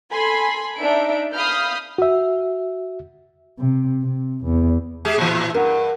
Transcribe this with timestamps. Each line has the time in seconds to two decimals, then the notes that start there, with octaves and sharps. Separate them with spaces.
0.12 A4 G#5 B5 C6
0.78 D4 D#4 E5 D7
1.34 F5 B5 D#6 F6 G6
1.98 F#4 E5
3.59 C3
4.02 C3
4.45 E2
5.05 G#3 G4 G#4
5.18 A2 E3
5.54 G2 A#4 F#5